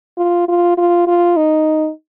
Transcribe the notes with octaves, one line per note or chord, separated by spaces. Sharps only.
F4
F4
F4
F4
D#4